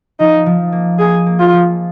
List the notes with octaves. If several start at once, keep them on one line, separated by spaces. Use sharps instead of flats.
F3 D#4
F3
A#3
A#3 G#4
A#3
F4
F3